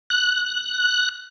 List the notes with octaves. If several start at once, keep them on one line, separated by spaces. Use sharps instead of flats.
F#6